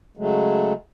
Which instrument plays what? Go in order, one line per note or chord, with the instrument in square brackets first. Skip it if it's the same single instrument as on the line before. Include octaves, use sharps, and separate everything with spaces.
[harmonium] C#3 F#3 G#3 A3